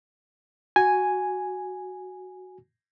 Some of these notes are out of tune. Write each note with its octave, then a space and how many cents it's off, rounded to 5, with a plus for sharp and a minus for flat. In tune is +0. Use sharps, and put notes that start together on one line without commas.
F#4 +0 G#5 +0